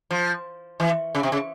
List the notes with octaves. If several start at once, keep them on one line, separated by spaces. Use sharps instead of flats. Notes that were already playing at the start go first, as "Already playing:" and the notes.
F3
E3
C#3
C3
C#3